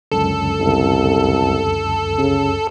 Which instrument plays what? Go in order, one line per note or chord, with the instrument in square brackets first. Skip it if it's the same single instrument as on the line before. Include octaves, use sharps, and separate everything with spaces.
[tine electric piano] C#2 F#2 D3 [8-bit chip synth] A4
[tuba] C2
C#3